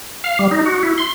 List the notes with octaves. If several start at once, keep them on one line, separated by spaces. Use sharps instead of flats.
F5
G3
D#4
F#4
E4
C6